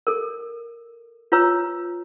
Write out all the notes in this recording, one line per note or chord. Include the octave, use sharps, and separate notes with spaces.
A4 A#4
F4 B4 C#5 A#5 E6